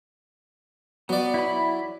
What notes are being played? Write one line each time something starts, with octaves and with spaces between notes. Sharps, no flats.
F#3 B3 D5
E4 B5